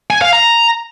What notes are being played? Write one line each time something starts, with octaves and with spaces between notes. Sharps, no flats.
G#5
F5
A#5